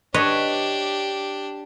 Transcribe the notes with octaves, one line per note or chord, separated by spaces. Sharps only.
D4 G4 B4 C#5 D#5